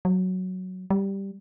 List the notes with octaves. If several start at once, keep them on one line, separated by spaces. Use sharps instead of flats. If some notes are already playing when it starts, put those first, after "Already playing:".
F#3
G3